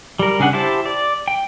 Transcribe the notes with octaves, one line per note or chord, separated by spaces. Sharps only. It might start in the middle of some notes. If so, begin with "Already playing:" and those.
G3 A#4
C#3 D4 G#4 F#5
E4 G4 C5 A5
D5
G5